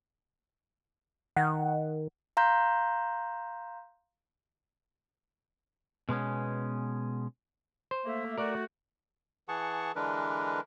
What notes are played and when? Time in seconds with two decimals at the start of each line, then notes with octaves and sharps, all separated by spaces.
1.36 D#3 F#5
2.37 F5 A#5 C6 G6
6.09 B2 G#3 B3 C#4
7.91 C5
8.06 A3 A#3 E5
8.38 A3 F#4 A#4 D5
9.48 E3 G#4 F#5 A5 C#6
9.96 D3 E3 G#3 D4 A#4 B4